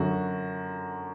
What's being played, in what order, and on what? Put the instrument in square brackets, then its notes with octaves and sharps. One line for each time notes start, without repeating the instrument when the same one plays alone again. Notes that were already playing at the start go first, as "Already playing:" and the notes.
Already playing: [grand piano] F#2 D3 F#4